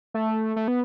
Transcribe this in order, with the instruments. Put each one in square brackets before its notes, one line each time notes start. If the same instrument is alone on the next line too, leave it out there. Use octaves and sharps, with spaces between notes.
[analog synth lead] A3
A3
B3